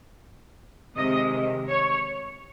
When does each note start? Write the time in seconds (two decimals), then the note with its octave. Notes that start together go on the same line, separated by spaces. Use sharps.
0.96 C3 D#3 G#3 D#5
1.69 C#5